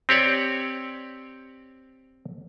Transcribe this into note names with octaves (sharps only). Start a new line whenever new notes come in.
C4 G4 C#5 D5